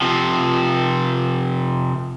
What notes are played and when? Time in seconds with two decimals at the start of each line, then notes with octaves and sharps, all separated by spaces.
0.02 C3 F3